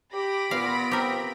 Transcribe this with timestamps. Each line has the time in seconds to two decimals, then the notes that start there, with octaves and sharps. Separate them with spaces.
0.13 G4 B5 A#6 D7
0.51 A#2 B3 F4 F5
0.91 C4 G4 A#4